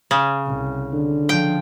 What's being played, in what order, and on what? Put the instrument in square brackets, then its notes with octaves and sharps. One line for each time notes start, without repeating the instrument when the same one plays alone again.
[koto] C#3
[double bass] C2
[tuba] D3
[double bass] F3 [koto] G5